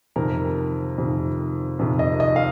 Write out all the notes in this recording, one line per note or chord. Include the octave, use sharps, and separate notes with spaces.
F2 C3 D#3 A#4
F2 C3 D#3
F2 C3 D#3
D#5
D#5
F5